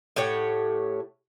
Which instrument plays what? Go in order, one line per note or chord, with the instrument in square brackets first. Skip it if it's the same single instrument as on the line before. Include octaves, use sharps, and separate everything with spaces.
[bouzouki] A2 G4 C#5 F#5